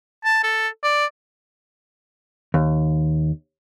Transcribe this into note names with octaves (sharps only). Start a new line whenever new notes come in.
A5
A4
D5
D#2